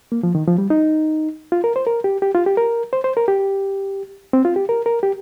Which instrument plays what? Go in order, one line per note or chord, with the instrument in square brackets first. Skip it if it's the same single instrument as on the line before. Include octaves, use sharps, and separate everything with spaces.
[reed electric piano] A#3
F3
D#3
F3
G3
D#4
F4
A#4
C5
A#4
G4
G4
F4
G4
A#4
C5
C5
A#4
G4
C4
F4
G4
A#4
A#4
G4